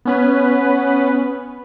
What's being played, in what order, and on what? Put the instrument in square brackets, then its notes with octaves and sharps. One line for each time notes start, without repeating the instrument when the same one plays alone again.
[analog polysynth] B3 C#4 B4